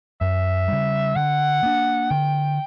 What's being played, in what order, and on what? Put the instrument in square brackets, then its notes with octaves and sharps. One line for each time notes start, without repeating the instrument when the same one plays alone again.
[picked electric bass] F#2 [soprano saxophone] E5
[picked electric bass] C#3 G3
[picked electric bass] D3 [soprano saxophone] F#5
[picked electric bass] A#3 D4
[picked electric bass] D3 [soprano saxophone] G5